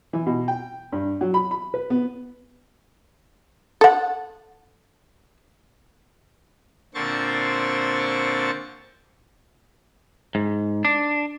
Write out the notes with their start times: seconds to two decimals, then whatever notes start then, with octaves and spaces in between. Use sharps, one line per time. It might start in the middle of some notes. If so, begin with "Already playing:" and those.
0.13 E3
0.26 B2
0.48 G5
0.92 G2
1.21 F#3
1.34 B5
1.51 B5
1.74 B4
1.90 B3
3.81 A4 F#5
6.94 A#2 D3 C4 C5 C#6 A6
10.35 G#2
10.85 D4